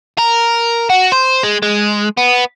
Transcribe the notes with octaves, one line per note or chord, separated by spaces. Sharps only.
A#4
F#4
C5
G#3
G#3
B3